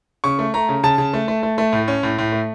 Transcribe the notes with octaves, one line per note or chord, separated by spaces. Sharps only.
C#3 C#6
A3
A3 A#5
C#3
C#3 A5
C#3
A3
A3
A3
A3
A2
C#4
A2
A2
A3